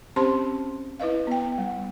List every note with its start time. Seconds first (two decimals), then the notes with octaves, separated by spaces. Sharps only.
0.16 C4 C#4 G4 C5 A5 C6
0.99 E4 B4 D#5 F5
1.27 B3 G5
1.58 G3